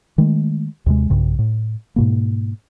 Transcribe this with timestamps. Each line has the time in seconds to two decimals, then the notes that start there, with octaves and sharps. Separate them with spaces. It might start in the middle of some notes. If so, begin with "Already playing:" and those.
0.18 D#3 G#3 A3
0.86 D#2 C3 G#3
1.10 B1 G2 C#3
1.39 A2
1.96 G#2 B2 A#3